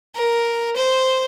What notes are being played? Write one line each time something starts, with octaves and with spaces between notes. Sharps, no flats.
A#4
C5